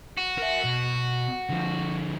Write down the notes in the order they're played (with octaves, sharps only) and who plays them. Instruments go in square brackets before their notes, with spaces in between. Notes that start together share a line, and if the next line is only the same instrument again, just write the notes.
[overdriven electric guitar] F#4
[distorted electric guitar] A#4 E5
B2
D3 F3